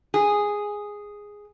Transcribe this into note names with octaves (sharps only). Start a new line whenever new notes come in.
G#4